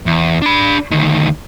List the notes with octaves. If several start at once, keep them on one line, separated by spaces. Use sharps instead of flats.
E2
D4 B5
D2 D#3